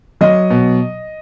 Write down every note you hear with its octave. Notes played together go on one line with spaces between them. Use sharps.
F#3 D#5
B2